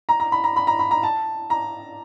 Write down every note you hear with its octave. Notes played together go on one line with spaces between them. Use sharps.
A#5
A#5
B5
A#5
B5
A#5
B5
A#5
A5
A#5